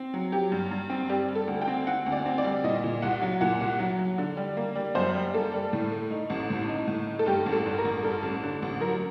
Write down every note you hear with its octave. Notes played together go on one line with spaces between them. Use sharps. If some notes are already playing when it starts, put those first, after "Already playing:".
Already playing: C4
F#3
F#3 G4
G2
G2
C4
G3 G4
G3
A4
D2
G5
C4
C4 F#5
D2
D5
C4
D5
G3
A#2 D#5
A#2
C2 F#5
F#3
A#2 F#5
C2
F#3
F#3
D3
G3
A#3
G3
F#2 C5
G3
A#3 A4
G3
A2
A3
D#4
A1
A2
D#4
A2
D#4
A4
G2 G4
A1
A4
G2
A#4
A1
G2 A4
A1
D3
A1
F#3 A#4